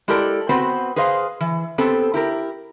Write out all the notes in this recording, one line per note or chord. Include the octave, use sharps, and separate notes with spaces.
G#3 E4 G4 A4 A#4 D5
B3 C4 F#4 B4 C5
G#4 B4 C5 D#5 F5
E3
B3 C4 G4 A4
E4 G4 A#4